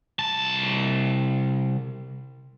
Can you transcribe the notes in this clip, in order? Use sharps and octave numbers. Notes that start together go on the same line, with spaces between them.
C2 A5